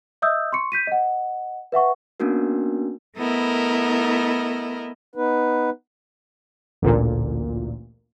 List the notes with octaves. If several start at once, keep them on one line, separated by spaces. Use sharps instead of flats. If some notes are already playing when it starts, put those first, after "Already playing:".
D#5 E5 D#6 E6 G6
C6 C#6 C#7
G6 B6 D#7
D#5 F#5
B4 E5 F#5 C#6
A#3 B3 C#4 D4 F#4 A#4
A3 B3 E4 A#4 D#5
B3 D#4 B4
A1 D2 A#2